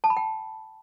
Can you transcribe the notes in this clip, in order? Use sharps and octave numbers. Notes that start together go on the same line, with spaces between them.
A5
B5
G5